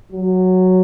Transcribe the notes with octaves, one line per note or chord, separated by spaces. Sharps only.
F#3